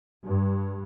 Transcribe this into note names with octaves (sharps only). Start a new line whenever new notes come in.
G2